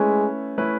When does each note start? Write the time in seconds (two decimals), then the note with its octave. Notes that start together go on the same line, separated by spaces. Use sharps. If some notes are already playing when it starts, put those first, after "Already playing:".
Already playing: G#3 A3 C#4 E4 B4
0.58 A3 C#4 E4 B4